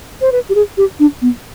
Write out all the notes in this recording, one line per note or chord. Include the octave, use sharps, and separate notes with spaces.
C5
B4
G4
G#4
G4
D4
B3